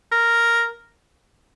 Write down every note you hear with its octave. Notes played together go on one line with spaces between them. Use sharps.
A#4